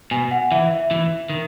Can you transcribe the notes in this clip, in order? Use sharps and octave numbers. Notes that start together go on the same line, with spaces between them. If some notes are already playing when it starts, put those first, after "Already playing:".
B2 G#5
F#5
E3 E5
E5
E3
D#3